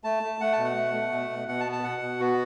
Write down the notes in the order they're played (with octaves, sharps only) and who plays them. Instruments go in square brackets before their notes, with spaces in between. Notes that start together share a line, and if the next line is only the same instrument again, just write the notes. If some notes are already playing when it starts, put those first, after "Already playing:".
[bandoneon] A3 A5
A3
A3 F#5
A5
B2
F#5
A3
A3
B2
B2
B2 F#5
A5
B3
A5
B2 F#5
B2
B3 F#4